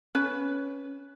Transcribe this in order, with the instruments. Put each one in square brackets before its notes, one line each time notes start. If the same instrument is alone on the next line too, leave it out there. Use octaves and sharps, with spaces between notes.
[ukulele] C#4 B4